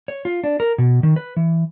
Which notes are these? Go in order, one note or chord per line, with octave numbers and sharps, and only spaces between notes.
C#5
F4
D4
A#4
B2
D#3
B4
E3